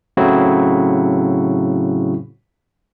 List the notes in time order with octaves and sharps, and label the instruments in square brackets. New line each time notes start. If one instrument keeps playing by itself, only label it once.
[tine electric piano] A2 C#3 F#3 C4 E4 F#4